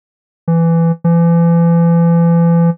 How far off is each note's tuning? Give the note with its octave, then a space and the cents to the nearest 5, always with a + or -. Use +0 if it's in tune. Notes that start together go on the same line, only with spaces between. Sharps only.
E3 +15
E3 +40